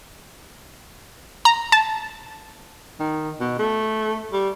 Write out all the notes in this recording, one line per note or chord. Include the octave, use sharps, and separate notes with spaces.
A#5
A5
D#3
B2
A3
G3